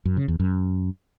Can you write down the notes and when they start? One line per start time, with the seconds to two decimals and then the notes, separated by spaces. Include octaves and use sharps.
0.05 F#2
0.17 C#3
0.28 E2
0.40 F#2